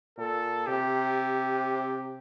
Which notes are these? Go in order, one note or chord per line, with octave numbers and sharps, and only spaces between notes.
A#2 A4
C3 G4